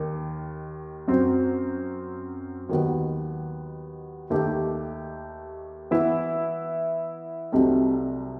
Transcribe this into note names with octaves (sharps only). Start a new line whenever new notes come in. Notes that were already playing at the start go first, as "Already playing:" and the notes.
Already playing: D#2 D#3
F#2 F#3 C4
D#2 D#3 F#3 B3
D#2 D#3 A3 D#4 G4
E3 B3 E4
C2 C3 F#3 A3 D#4